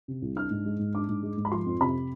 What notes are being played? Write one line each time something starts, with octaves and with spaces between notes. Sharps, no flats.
C3
C2
D4 F6
G#2
G#3
G#2
D4 D6
G#2
G#3
G#2
B5
F3 C6
F2
C3 B5